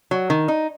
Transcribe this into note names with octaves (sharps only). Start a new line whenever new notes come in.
F#3
D#3
D#4